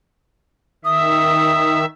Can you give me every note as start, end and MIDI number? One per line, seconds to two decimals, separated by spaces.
0.85 1.85 51
0.85 1.85 76
0.85 1.81 87